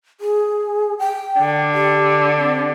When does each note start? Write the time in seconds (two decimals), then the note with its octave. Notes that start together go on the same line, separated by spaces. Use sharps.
0.21 G#4
0.99 G5
1.40 D3
1.74 G4
2.37 C4